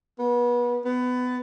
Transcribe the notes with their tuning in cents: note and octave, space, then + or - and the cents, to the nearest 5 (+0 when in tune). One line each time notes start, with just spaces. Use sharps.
B3 -30
B3 +20